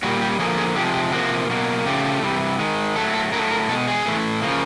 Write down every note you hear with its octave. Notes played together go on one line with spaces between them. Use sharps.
A#2 G3 A#3 F#4
G4
D3 F3 A#3 G#4
G#4
C3 F3 G#3 G4
G4
C3 F3 A#3 F#4
B2 F#3 A#3
C#3 F3 A3 G4
C3 E3 G3
D#3 G#3
A2 F#3 A3 A4
A4
A2 F#3 A3 A#4
A#4
B2 G#3 A4
G#4
A2 E3 A3
C#3 F3 A#3